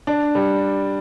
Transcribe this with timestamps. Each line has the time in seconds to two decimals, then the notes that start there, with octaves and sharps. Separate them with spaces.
0.07 D4
0.35 G3